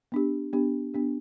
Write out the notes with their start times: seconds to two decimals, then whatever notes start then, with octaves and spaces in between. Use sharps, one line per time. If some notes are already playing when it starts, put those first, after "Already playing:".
0.12 B3 D4 G4
0.53 B3 D4 G4
0.94 B3 D4 G4